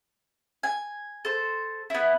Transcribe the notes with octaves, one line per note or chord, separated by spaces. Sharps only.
G#5
A4 C5
B3 E4